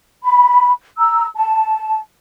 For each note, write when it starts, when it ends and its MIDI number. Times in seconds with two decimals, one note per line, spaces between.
0.23 0.70 83
0.97 1.25 82
0.97 1.25 88
1.34 1.98 81